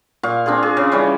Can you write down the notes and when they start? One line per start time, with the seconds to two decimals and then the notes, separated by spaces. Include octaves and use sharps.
0.23 A#2 F5 C#6
0.46 C4 D4 F4 G#4
0.63 G#4
0.77 C#3 C#4
0.92 E3 F3 G3 C#4